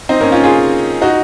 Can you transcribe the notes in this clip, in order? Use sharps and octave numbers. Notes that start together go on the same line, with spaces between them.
C4 D#4
A#3 C#4
C#4 F4
F4 G#4
D#4 F#4